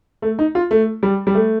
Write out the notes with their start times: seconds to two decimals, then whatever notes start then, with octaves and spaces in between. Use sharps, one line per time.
0.22 A3
0.39 D#4
0.55 F4
0.71 A3
1.03 G3
1.27 G3
1.35 A3